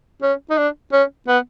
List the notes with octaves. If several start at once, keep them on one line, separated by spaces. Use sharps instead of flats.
C#4
D#4
D4
C#4
B3